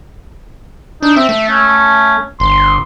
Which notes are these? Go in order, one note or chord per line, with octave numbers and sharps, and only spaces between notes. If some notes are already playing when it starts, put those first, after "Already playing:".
D4 D#4
C4 E5
A3
C#4
G1 C6